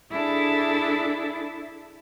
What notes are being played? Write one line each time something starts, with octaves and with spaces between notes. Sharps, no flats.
D4 E4 G#4 A4 A5